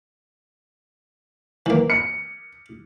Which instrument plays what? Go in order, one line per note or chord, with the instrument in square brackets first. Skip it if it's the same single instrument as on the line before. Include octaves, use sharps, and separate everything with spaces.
[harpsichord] E3 A#3
[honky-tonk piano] C#7